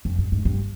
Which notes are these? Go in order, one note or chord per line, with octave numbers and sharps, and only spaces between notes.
F2
G2
G#2
G2